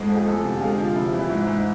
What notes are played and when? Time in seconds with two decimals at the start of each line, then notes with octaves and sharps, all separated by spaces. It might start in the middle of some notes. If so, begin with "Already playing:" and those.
Already playing: F2 G#2 G#3 G#4
0.09 F3
0.16 G#4
0.26 E2 A3 A4
0.43 C3
0.56 F4
0.60 D3 G#3 G#4
0.78 F3 F4
0.95 C3 E4
1.13 E3
1.19 E4
1.29 G#2
1.47 G#2